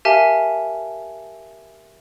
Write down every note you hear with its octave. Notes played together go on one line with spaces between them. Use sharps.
G4 A#4 E5 F5 G#5 A5